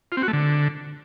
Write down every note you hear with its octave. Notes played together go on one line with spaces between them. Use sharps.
F4
C4
F#4
A3
D3